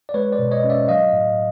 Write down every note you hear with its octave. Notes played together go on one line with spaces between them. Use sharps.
D5
G#3 B4 C#5
C5 D5
B2
C#5 D#5
C#4
D5 E5
F#3 D#5 F5
A2